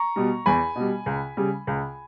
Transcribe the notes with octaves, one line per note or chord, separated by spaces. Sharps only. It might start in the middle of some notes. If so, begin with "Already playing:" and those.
Already playing: A#5 C#6
B2 G3
E2 G#5 B5
B2 G3
C#2
C#3 G3
C#2